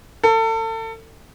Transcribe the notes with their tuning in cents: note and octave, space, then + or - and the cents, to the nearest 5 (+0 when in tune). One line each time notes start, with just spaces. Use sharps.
A4 +35